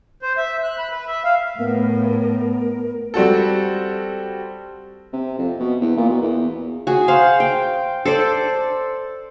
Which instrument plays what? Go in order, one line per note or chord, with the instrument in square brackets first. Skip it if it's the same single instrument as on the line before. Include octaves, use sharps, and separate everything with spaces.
[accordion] C5
E5
F#6
B5
B4
E5
F5
[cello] A2 [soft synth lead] B3 [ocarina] A#4
[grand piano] G3 C4 F#4 A4
[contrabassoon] C3
F2
B2
E2
A#2
B2
E2
[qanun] F#4 G#4
C5 F5 F#5
G5
A4 C5 D5